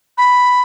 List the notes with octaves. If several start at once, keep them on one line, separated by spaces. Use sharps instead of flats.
B5